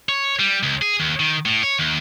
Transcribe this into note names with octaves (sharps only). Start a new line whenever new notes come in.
C#5
G3
C#2
G#4
D#2
D#3
A2
C#5
D#2